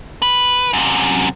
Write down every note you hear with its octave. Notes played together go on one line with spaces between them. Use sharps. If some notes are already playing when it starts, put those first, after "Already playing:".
B4
F#2 C3